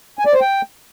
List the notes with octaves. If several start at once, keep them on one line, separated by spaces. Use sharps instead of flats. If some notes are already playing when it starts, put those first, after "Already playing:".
G#5
D5
C5
G5